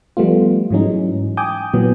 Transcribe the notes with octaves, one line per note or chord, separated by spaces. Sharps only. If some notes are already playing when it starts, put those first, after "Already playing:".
F3 G3 A3 B3 F4
G#2 E3 F#3 G#3 C#4 D#4
G5 G#5 D6 D#6 G6
A#2 E3 F#3 B3